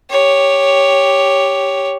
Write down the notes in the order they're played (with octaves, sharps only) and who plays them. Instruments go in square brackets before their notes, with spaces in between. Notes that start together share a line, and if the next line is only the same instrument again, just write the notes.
[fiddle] G4 C#5